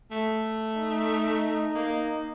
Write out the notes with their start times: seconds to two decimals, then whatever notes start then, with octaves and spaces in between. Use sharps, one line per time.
0.11 A3
0.76 D#4
1.75 A#3